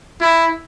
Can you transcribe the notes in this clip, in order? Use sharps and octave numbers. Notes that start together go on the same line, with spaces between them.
E4